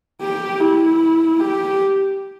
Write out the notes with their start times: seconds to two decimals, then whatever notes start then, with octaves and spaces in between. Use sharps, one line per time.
0.22 G4
0.60 E4
1.40 G4